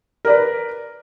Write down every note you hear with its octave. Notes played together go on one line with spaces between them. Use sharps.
A#4 B4 D5